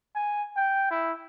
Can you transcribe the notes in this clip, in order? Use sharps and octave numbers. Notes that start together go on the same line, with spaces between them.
G#5
G5
E4